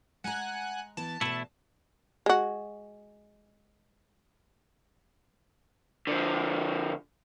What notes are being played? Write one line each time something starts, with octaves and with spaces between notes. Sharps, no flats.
G#3 F#5 G#5 A#5 F#6
E3 B3 E4 A5
E2 B2 A3 E4
G#3 F#4
D3 F3